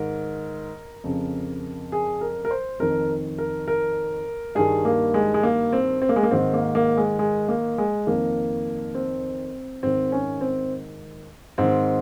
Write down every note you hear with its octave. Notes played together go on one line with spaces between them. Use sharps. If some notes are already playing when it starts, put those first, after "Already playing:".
Already playing: G#2 D#3 A#4
F2 C#3
G#4
A#4
A#4
C5
F2 D#3 A#4
A#4
A#4
G2 D#3 G#4
A#3
G#3
G#3
A#3
C4
C4
A#3
G#3
A#3
G#2 D#3 C4
A#3
A#3
G#3
G#3
A#3
G#3
F2 D#3 A#3
C4
G#2 D#3 C4
C#4
C4
G#2 D#3 C4